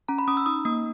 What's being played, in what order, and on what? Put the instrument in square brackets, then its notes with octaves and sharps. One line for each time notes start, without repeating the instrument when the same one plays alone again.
[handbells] C#4 A#5
B5
C#4 D#6
E6
D#4 D#6
A#3 D#6